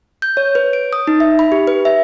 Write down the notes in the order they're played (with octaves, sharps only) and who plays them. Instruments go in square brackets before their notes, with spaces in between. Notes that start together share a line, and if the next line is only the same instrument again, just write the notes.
[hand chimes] G6
C#5
B4
D7
D#6
D#4
E5
B5
G4
B4
E5